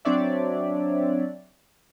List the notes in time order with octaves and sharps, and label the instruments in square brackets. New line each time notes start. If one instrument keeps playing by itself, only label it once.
[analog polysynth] F#3 C4 D4 C#5 D5 E5